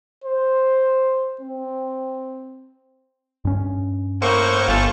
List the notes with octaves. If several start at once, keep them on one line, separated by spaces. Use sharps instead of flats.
C5
C4
G2 C#4
A2 A#3 C5 C#6
G1 E3 F4 A4